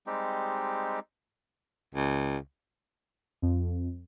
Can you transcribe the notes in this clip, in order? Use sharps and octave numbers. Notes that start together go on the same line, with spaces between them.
G3 G#3 C4 D#4 G4
C#2
F2